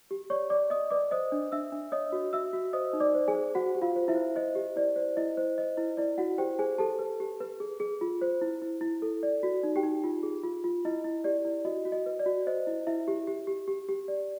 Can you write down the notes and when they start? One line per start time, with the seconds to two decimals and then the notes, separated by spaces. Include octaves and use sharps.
0.11 G4
0.30 C#5 D5 C#6
0.50 D5 D6
0.70 D5 D#5 D#6
0.91 B4 D5 D6
1.11 C5 D#5 D#6
1.32 D4
1.52 D4 E5 E6
1.72 D4
1.92 C#5 D#5 D#6
2.12 F#4
2.33 F#4 E5 E6
2.53 F#4
2.73 C5 D#5 D#6
2.93 D#4
3.00 D5 D6
3.15 C5
3.28 G#4 G#5
3.34 C5
3.55 F#4 C5 F#5
3.75 G4
3.82 F4 F5
3.96 C5
4.08 E4 E5
4.15 C5
4.36 C5 D#5
4.55 G4
4.76 E4 D5
4.96 C5
5.17 E4 D#5
5.37 C5
5.58 C5 D#5
5.77 E4
5.97 E4 D5
6.18 E4 F#4 F#5
6.38 G4 C5 G5
6.59 G#4 C5 G#5
6.78 G4 A4 A5
6.99 B4
7.20 G4
7.40 B4
7.60 G#4
7.80 G#4
8.01 F4
8.21 C5
8.41 E4
8.62 E4
8.81 E4
9.02 A4
9.23 D5
9.43 F#4
9.63 D#4
9.76 G4 G5
9.83 D#4
10.04 F4
10.23 G#4
10.44 F4
10.64 F4
10.85 E4 D#5
11.04 E4
11.24 G4 D5
11.45 E4
11.65 F#4 D#5
11.85 F#4
11.92 D#5
12.06 B4
12.19 D5
12.26 F#4
12.47 C5 D#5
12.67 E4
12.87 E4 E5
13.08 G4
13.27 G4
13.47 G4
13.68 G4
13.89 G4
14.08 D5